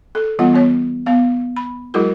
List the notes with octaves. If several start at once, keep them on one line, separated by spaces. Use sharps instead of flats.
A4
E3 G3 B3 F4 F#5
B3 C#5
B3 F5
B5
F#3 G#3 E4 F#4 G#4 A#4